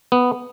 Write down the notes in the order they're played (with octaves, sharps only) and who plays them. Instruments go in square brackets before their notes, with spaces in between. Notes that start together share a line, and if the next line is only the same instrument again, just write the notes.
[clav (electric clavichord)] B3